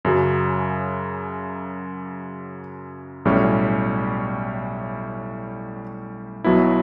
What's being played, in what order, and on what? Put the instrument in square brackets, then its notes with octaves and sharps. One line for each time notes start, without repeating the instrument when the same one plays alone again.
[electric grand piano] F#2 C#3 F#3
B1 A2 G3 C#4
B1 B2 F#3 B3 E4